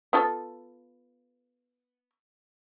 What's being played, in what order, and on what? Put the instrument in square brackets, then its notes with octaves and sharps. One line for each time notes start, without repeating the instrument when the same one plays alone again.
[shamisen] B3 F4 A4